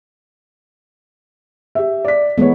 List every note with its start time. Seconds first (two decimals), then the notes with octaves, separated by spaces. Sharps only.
1.75 G4 E5
2.05 D5 B6
2.38 E3 G#3 A3 B3 C#5